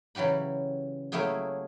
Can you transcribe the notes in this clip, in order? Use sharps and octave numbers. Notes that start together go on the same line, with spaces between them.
C#3 E3 F#3 G4 B5
F#3 A3 A#3 E4 G4 G#4